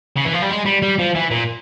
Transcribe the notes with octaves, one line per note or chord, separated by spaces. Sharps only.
C#3
E3
F3
G3
G#3
G3
G3
F3
E3
A#2